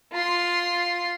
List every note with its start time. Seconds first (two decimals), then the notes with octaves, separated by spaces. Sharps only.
0.13 F4 C6